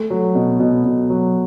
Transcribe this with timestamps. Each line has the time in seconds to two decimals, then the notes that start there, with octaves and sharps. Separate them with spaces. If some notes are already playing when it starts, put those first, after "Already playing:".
Already playing: A3
0.10 F#3
0.35 B2
0.60 B2
0.84 B2
1.10 F#3